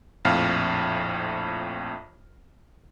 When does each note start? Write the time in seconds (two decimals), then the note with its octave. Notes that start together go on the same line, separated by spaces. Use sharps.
0.25 A#1 F2 A2 F5 F6